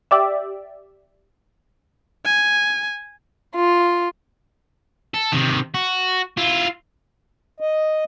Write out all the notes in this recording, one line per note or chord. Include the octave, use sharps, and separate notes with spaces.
G4 D5 E5
G#5
F4
A4
C3 D#3
F#4
E4 F4
D#5